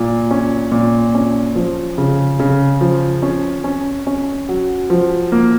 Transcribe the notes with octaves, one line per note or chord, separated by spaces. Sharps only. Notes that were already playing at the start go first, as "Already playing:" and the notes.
Already playing: A#2
C#4
A#2
C#4
F3
C#3
C#3
F3
C#4
C#4
C#4
F#3
F3
A#3